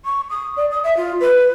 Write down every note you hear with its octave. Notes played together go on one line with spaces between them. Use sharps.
C#6
D#6
D5
D#6
E5
F4
B4